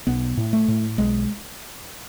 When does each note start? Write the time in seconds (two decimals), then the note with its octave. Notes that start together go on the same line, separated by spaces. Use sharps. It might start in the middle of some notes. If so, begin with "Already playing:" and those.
0.07 B1 B3
0.37 A2
0.53 A3
0.68 A2
0.98 B1 G#3